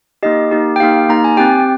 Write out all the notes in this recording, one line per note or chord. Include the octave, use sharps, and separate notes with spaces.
A#3 D#4 G4 D#5
A#3 D#4 G4
G5
A#3 D#4 G4 F5
A#3 D#4 G4 A#5
G#5
C4 G4 G5